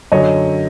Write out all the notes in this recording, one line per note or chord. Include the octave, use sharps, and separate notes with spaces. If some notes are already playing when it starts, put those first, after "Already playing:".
F#2 D3 F#3 C#5 D#5